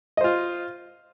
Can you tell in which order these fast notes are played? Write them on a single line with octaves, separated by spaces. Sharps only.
D#5 C5 F4